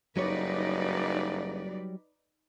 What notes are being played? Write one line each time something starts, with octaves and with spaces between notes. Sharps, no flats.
F#1 F#3 G3 D#4 B4 C#5 D5